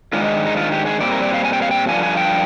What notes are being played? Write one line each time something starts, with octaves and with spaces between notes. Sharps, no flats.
G#2 D#3 G#3 D4 F4
D#4
D#4
F4
G4
G#4
A#2 G3 C4 D5
A#4
D5
F5
G#5
G5
F5
G5
G2 D3 F3 G#5
G#5
G5